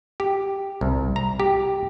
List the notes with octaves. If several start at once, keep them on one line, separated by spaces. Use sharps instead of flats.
G4
C2
A#5
G4